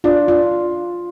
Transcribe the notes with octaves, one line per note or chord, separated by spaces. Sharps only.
D4 F4
F4